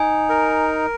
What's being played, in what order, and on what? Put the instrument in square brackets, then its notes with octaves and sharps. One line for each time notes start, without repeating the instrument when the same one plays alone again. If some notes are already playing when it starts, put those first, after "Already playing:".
Already playing: [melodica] D#4 [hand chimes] G#5
[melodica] A#4